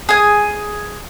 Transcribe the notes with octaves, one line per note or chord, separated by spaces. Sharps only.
G#4 G#5